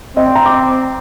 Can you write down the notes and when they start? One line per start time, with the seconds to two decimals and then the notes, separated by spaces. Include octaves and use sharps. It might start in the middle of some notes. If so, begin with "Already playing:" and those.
0.16 C4 D#5
0.26 D5
0.35 A#5
0.46 D6